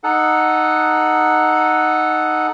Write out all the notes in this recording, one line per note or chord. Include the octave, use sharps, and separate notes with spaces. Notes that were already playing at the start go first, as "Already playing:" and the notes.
D#4 A4 F#5